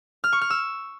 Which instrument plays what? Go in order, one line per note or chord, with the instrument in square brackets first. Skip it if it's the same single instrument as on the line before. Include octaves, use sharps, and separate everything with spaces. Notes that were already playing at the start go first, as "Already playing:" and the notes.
[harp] F6
C#6
F6
E6